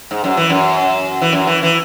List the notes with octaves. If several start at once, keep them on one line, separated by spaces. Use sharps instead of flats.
G#2
F#2
E3
F#2
E3
F#2
E3
E3